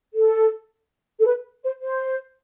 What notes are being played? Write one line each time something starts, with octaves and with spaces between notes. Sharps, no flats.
A4
A4
B4
C5
C5